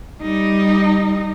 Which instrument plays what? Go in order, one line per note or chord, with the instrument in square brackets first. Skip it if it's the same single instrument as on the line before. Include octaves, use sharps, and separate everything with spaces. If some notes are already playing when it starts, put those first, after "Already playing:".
[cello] G3 D#4